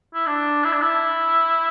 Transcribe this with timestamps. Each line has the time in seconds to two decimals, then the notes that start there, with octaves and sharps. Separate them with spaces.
0.14 E4
0.27 D4
0.64 E4
0.73 D4
0.82 E4